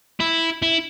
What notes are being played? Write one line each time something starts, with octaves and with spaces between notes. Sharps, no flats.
E4
E4